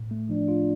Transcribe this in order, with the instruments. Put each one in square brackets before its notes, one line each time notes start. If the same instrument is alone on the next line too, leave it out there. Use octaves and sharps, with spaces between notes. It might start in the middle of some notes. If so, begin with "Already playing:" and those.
Already playing: [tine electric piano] A2
A3
[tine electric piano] F3 [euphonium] D4
[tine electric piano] F4